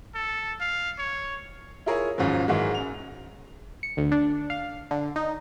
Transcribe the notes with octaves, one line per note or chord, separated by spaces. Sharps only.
A4
F5
C#5
E4 F4 G#4 A#4 C#5
D#2 G#2 C#3 F3 F#3
G#2 D#3 E3 F#3 G#3
F#2 F7
C#7
D2
D4
F5
D3
D#4